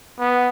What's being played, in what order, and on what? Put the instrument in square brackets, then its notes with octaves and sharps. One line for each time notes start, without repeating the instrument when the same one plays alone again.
[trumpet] B3